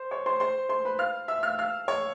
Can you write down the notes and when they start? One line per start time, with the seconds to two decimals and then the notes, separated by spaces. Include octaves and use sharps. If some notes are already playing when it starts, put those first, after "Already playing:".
Already playing: C5
0.11 C#5 C#6
0.26 C5 C6
0.40 C5 C6
0.69 C5 C6
0.85 B4 B5
0.99 F5 F6
1.28 E5 E6
1.43 F5 F6
1.59 F5 F6
1.88 C#5 C#6